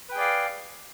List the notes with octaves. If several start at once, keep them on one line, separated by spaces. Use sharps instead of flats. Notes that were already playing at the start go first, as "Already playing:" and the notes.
G#4 B4 D5 F5 G5